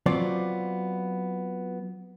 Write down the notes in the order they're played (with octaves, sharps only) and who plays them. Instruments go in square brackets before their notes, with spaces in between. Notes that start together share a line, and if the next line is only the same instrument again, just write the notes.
[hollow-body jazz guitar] F#3 B3 C4 F4 D5